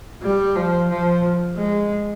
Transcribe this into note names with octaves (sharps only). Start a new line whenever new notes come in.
G3
F3
F3
G#3